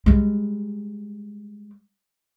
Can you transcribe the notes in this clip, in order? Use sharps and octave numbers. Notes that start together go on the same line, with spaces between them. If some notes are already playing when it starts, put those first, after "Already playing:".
G3 G#3